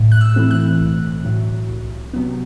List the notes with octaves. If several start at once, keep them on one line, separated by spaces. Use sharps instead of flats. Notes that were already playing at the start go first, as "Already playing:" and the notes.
Already playing: A2
F#6
E6
E3 A3 C4
F#6
B1
A2 F#3
C2
C3 F#3 B3